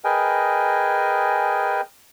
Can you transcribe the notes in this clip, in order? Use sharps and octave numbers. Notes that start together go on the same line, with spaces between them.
G#4 A#4 B4 D#5 G5 G#5